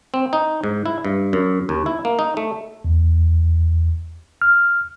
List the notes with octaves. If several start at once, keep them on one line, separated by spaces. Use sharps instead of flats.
C4
D#4
G#2
E4
G2
F#2
D#2
E4
A#3
D#4
A3
E2
F6